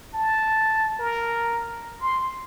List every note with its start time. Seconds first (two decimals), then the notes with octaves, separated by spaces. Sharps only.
0.14 A5
0.99 A#4
2.00 C6